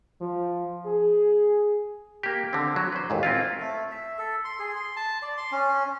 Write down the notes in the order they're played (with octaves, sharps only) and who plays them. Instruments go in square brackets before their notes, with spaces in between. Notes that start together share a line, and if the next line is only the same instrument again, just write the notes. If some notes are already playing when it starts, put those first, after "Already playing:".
[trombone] F3
G#4
[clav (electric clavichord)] A#3 G4
D3 C4
F#3
B4 C5
A1 D#2 G#2
C4 E4 F4
[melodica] A3
E5
A4
C6
G#4
C6
A5
D5
C6
C#4